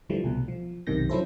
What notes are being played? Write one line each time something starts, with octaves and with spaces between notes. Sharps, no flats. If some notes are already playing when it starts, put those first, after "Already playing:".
D3 E3 F3 G3 A3
C2 B2
F3
B1 F#2 C3 D#3 G6 A#6
F3 F#3 C#4 E4 A4 C5